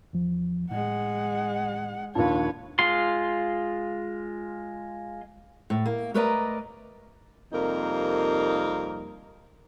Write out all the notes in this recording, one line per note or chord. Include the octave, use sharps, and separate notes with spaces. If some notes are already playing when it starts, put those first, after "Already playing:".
E2 F3
A2 G#3 F#5
A#1 D#2 B4 C#5 A5
G#3 F4 C6
A2
A#3
A3 A#4 B4 D5 D#5 A#5
F2 C3 G3 A#3 D#4 A#4